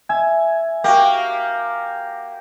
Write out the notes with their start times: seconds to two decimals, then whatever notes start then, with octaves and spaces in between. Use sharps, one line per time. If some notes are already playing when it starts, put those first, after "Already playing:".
0.09 E5 G#5
0.84 A#3 F#4 G4